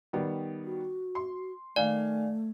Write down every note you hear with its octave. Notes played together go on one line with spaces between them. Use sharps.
D#3 G3 B3
F#4
C6
D#3 A3 D5 F5 G#5